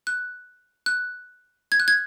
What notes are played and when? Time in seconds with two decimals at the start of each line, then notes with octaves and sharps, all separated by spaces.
0.07 F#6
0.86 F#6
1.72 G#6
1.80 F#6
1.88 G#6